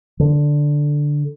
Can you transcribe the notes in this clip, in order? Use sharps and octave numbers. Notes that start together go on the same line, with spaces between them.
D3